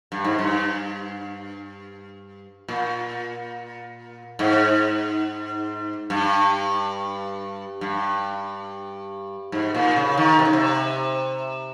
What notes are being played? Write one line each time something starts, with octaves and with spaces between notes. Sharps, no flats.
G2
G#2
G2
A#2
G#2
G2
G2
G#2
A#2
C#3
D#3
C3
C#3
C3